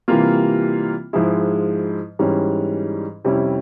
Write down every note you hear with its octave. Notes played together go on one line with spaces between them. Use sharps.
C3 E3 G3 A#3 F4
G#2 F3 G#3 E4 G#4
G#2 E3 G3 C#4
F2 C3 G3 C#4 E4